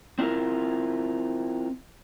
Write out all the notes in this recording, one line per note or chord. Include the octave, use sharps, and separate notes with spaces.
C4 D4 E4 F4 A#4